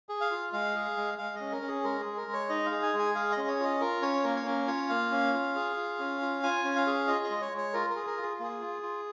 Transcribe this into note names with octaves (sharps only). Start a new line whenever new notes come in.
G#4
F5
F4
G#3 F5
G#4
G#3
G#3 F5
C#4 D#5
A#4
C#4
G#4
G#3 A#4
G#4
G#3
A#4
G#3
C#5
D#4 D#5
F5
G#4
G#5
G#3
G#5
G#4 F5
D#5
C#4
C#5
F4 D#5
F4 A#4
C#4 C#5
A#3 A#4
C#5
C#4 A#4
F4 C#5
A#3 F5
C#4
F4
G#4
F4
C#4
F4
F4 G#5
C#4
F5
G#4
F4 D#5
D#5
G#3
C#5
G#3
C#5
F4 A#4
A#4
G#4
A#4
F4
G#4
A#3 G#4
F4
F4